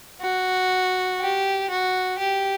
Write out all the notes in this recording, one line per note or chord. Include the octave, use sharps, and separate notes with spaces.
F#4
G4
F#4
G4